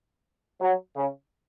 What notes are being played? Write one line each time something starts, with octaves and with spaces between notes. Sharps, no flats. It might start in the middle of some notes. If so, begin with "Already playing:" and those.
F#3
C#3